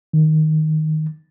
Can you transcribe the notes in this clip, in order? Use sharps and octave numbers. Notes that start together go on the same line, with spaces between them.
D#3